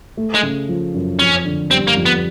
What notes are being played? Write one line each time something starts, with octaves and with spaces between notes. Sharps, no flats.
A3
G#3
C#3
F3
F#2
F2 C#4
D3
G3 C4
A#3
F2
B3